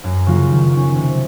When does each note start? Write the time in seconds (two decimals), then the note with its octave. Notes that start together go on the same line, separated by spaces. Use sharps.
0.04 F#2
0.26 C#3 F#3 A#3 F4
0.49 D#3
0.73 F#3 C#4
0.95 C3